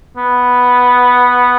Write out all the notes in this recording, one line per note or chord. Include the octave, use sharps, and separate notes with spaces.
B3